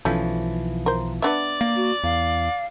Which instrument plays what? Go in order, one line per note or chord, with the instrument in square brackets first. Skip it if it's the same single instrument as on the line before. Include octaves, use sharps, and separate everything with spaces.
[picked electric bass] B1 E3 F3 [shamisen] A3 C#4
[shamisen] A#4 C5
[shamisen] B3 D4 E5 [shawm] D5
[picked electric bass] A#3
[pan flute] F#4
[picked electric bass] E2 [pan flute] F5